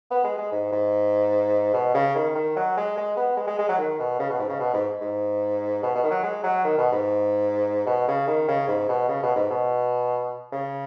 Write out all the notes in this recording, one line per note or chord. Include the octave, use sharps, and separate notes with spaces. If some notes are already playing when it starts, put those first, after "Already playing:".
B3
G#3
G#3
G#2
G#2
B2
C#3
D#3
D#3
F#3
G#3
G#3
B3
G#3
G#3
G#3
F#3
D#3
B2
C#3
B2
G#2
C#3
B2
G#2
G#2
B2
B2
D#3
F#3
G#3
F#3
D#3
B2
G#2
B2
C#3
D#3
C#3
G#2
B2
C#3
B2
G#2
B2
C#3